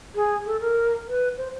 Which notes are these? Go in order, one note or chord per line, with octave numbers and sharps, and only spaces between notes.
G#4
A4
A#4
B4
C5